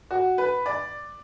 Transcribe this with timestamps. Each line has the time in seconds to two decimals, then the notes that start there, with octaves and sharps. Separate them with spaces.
0.11 F#4
0.38 B4
0.66 D5